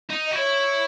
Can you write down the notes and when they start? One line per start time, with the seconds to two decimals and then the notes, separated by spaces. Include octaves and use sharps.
0.10 D#4
0.26 D#5
0.32 F#4
0.36 E4 C#5